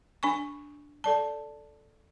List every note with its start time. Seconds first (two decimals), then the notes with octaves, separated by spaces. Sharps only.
0.23 D4 G#5 C#6
1.04 A4 D5 A5